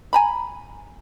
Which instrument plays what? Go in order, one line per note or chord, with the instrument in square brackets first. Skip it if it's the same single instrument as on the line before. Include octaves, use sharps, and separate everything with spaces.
[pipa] G#5 A#5 B5